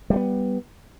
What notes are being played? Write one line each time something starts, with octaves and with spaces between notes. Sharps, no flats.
G3 A3 B3